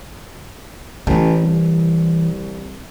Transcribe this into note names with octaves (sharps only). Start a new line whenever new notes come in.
A1 E3
C2